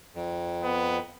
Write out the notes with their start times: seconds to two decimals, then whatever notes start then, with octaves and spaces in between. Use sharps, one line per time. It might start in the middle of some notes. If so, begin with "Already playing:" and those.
0.15 F2
0.63 B3